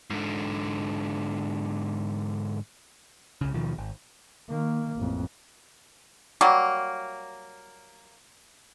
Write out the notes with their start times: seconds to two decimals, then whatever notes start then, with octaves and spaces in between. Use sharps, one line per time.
0.10 G#2 D3
3.41 C2 C#3
3.54 D#2 B2 D#3 F3
3.78 G#1
4.49 D#3 A#3
4.97 A1 F2
6.41 F#3 G3 A#3